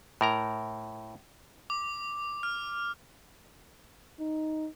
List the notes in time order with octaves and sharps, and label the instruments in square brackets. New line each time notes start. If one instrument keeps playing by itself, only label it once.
[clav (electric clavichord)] A2 A#4 A#5
[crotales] D6
F6
[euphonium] D#4